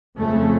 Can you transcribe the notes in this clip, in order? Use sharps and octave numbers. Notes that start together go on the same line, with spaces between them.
F2 C#3 A3